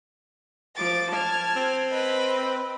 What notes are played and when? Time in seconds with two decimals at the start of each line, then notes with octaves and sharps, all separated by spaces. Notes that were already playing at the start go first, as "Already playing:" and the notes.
0.76 F3 D6 A6
1.12 A5 F6 G#6
1.57 C4
1.92 B4 D#5 B5